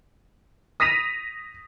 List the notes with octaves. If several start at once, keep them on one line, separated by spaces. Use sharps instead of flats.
D#6 A#6 B6 D#7 F7